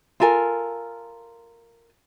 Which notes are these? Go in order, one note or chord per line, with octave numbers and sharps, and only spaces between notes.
F4 A4 A#4 G#5